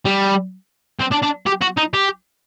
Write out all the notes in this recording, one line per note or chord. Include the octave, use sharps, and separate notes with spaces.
G3
C4
D4
D4
G4
F#4
D#4
G4